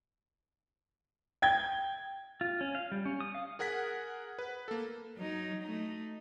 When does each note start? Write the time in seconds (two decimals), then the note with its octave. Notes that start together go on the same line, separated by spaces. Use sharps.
1.42 G5 G#6
2.41 F4
2.61 C#4
2.75 F5
2.92 G3
3.05 C#4
3.20 D#6
3.35 F5
3.59 G#4 A#4 F#5 G#6 B6
4.39 B4
4.68 A#3 A4
5.16 F#3 D#4
5.63 A3 D#4